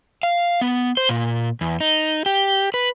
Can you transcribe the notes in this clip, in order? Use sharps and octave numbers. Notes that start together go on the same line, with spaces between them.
F5
B3
C5
A#2
E2
D#4
G4
B4